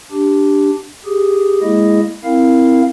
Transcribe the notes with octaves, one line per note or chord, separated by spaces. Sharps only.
D4 G4
G4 G#4
G#3 A#3 E4 G#4 D#5
C4 E4 A#4 F5